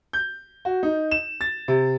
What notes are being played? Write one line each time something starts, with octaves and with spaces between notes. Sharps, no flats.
G6
F#4
D#4
E7
A6
C3